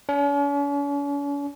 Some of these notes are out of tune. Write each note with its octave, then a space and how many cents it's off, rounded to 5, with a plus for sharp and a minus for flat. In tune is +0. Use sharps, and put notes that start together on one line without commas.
C#4 +45